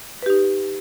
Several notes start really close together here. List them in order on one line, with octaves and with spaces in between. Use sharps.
B4 G4 D#4